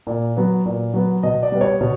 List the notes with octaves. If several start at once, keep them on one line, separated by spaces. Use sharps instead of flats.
A#2
F#3 B3
A#2
F#3 B3
B2 D#5
D5
G3 B3
C#5
B2